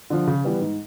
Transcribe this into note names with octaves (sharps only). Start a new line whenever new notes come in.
D3 F3
C#3
E3 G3 B3
G#2